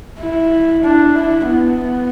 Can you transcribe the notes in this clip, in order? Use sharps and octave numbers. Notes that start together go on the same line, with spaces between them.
E4
D4
E4
B3